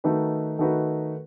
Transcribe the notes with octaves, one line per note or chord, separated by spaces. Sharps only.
D#3 A3 D#4 F#4 B4
D#3 A3 D#4 F#4 B4